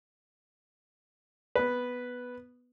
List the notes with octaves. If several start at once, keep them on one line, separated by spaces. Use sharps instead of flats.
B3 B4